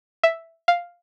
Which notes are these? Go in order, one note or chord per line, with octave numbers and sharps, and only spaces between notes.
E5
F5